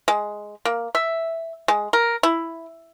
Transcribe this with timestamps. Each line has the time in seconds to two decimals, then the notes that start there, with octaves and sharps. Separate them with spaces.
0.08 G#3
0.65 A#3
0.95 E5
1.68 G#3
1.93 A#4
2.23 E4